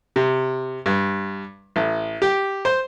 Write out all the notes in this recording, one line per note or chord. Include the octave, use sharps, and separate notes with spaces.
C3
G2
A1
G4
C5